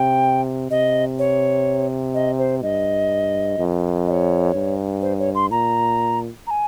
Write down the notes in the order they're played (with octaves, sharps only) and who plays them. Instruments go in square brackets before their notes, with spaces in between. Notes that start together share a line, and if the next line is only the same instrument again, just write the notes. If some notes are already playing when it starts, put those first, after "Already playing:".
Already playing: [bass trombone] C3 [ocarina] G5
[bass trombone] C3 [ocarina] D#5
[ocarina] C#5
D#5
C5
[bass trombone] G2 [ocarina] D#5
[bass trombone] F2
[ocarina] D#5
C#5
[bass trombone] G2
[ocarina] C5
C#5
C6
[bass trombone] A#2 [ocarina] A#5
[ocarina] A#5
G#5